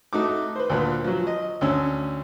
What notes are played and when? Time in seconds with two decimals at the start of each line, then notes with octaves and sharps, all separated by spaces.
0.13 A3 D#4 F#4 D6
0.56 B4 C5
0.70 D2 A#2 B4
1.04 F3 F#3
1.27 D#5
1.61 D2 C#4 E6